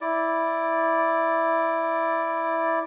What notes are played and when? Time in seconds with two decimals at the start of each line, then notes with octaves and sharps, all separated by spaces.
0.01 E4 D5